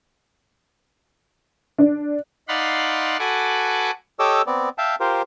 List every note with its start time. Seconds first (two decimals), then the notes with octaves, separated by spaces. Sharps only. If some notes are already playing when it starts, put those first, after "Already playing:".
1.78 D4
2.48 D#4 D5 F5 F#5 B5 C6
3.19 F#4 A4 B4 F#5 G#5 D6
4.19 G4 A4 C#5 D#5 D6 E6
4.47 B3 C4 D5
4.78 E5 F5 G5 A5
5.00 F4 G4 A#4 C5